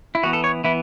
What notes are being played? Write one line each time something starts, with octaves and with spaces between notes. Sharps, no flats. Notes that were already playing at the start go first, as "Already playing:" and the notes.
E4
E3 B3 F#4
A4
C#5
E3 B3 E4